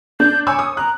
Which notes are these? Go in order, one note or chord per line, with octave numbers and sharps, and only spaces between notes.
D4 G6
C#5 G#5 D6 E6
D#6
A#5 F#6